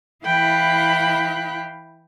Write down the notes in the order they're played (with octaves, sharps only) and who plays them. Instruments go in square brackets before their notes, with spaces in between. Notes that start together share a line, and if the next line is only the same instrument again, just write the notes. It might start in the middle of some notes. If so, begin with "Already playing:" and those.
[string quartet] E3 E4 F5 G5 B5 F#6